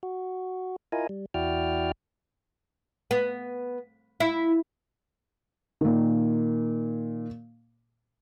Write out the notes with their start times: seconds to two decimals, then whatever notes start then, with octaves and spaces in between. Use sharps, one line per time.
0.03 F#4
0.92 E4 F4 A#4 D#5 G#5
1.09 G3
1.34 E2 E4 F#4 D5 G5 F6
3.11 B3
4.20 E4
5.81 A#2 D#3